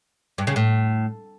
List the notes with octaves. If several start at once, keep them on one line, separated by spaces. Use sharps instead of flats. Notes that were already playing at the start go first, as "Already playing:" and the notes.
G2
C#3
A2